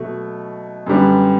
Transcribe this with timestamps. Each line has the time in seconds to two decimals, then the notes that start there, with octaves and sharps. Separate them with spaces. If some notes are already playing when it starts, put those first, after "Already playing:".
Already playing: B2 F#3 A3
0.86 F#2 D3 G3 B3